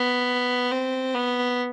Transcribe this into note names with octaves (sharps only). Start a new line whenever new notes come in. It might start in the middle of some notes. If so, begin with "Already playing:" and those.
Already playing: B3
C4
B3